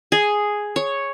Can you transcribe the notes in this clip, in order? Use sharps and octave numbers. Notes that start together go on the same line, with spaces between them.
G#4
C#5